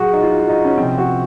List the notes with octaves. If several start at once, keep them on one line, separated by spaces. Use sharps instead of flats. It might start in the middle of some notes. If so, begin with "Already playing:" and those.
Already playing: A#2 F#3 F#4 G#4
D#4
F4
F4
D#4
C#4
C3 F3 C4
F#4